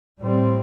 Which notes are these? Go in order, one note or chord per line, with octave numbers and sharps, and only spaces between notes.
A2 G3 C4